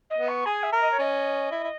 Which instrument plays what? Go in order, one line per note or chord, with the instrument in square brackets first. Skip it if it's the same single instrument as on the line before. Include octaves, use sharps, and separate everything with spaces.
[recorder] D#5
[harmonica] B3
[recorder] C#6
[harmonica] G#4 [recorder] G#5
[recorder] E5
[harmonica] A#4
[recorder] D#5
C#5
[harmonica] C#4 [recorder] D#5
[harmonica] E4
E4